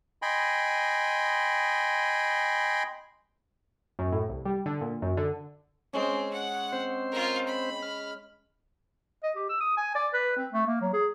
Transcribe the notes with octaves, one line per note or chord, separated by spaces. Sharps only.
D#5 G5 G#5 B5 C6
F#2
A2
C2
G3
D3
A#2
F#2
D3
G#3 C4 C#4
F#5
C4 C5
F4 A#4
B5
F6
D#5
G4
E6
D#6
G#5
D5
B4
C4
A3
A#3
F#3
G#4